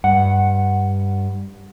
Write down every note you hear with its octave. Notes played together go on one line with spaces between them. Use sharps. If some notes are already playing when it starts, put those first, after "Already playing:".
G2 F#5